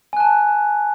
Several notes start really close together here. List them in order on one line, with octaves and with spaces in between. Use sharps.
G#5 F#6 A5